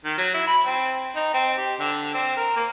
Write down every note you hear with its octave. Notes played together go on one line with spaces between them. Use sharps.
D#3
F#3
E4
B5
C4
D#4
C4
G4
D3
C4
A#4
A#3